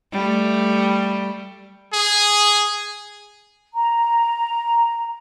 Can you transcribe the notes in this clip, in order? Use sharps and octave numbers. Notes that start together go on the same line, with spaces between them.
G3 A3
G#4
A#5